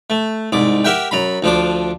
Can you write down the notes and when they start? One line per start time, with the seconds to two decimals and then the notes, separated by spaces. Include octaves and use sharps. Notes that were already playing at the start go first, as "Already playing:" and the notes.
0.10 A3
0.52 C2 G#2 D6
0.84 G4 A#4 E5 F#5 G5
1.11 F#2 A#5 B5
1.42 D2 F3 D4 D6